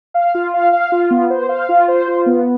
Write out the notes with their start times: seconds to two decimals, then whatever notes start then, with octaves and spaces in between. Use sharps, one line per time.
0.14 F5
0.35 F4
0.54 F5
0.73 F5
0.92 F4
1.11 B3
1.30 C5
1.49 F5
1.69 F4
1.88 C5
2.07 F4
2.26 B3